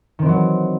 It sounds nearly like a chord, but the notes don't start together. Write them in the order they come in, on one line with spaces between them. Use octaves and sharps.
D#3 C4 E3 F#3